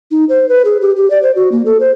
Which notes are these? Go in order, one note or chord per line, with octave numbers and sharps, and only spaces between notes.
D#4
C5
B4
G#4
G4
G4
D5
C5
F#4
A#3
A4
C5